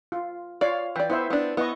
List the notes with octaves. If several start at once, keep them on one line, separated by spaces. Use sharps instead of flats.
F4
F4 C#5 D5 F5
E3 D5 G5
B3 E4 C5 E5
B3 D4
B3 E4 D#5 C#6